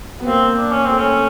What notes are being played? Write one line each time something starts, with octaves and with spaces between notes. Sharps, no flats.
B3
A#3 C4
D4
C#4
A3 C4
C#4